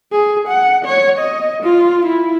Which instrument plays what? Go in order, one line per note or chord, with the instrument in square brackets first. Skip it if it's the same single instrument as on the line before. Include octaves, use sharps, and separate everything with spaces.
[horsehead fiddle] G#4
F#5
C#5
D#5
F4
E4